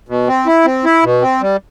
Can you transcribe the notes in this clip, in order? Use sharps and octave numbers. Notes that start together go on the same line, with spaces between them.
B2
C4
E4
C4
E4
B2
C4
G3